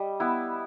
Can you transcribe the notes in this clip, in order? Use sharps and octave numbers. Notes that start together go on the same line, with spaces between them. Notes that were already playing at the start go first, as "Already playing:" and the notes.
Already playing: G3 D#5
B3 E4